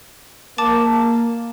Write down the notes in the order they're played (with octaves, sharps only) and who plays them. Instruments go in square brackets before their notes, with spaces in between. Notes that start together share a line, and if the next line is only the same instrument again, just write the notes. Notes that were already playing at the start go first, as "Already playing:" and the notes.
[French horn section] A#3 [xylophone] A5 D6 A6